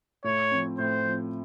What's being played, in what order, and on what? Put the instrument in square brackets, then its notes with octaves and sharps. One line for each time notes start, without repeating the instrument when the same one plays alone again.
[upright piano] A2 [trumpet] C#5
[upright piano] F3 C4
[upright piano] A2 [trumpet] C5
[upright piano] F3 C4